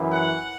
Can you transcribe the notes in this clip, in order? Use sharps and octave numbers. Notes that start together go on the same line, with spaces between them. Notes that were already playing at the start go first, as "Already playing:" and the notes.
Already playing: F#2 E3
F#5